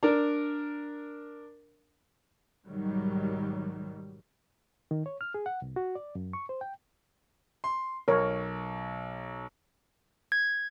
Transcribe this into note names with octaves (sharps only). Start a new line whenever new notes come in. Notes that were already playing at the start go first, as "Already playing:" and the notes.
D4 A#4
B1 G#2 D#3 F#3 G3
D#3
C#5
F6
G#4
F#5
C2
F#4
D5
F#2
C#6
C5
G5
C6
B1 A#4 C#5
G#6